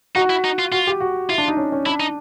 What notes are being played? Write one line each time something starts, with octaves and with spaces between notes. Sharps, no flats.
D#4 F#4
E4
D#4
F4
F4 F#4
G4
F#4
E4 F4
D4
D#4
C#4
C#4
D4 E4
D#4